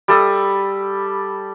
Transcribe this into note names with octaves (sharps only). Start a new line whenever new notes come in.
G3 A4 D#6